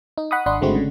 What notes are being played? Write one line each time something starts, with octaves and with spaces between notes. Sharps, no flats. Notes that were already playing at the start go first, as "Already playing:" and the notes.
D#4
F#5 B5 C#6 D#6
G#1 D4 F#5 B5 C6
G#1 D3 G#3 A3 C4 F#4
C#3